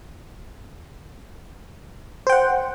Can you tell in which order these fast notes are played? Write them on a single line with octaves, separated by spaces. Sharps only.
C5 G5 F#5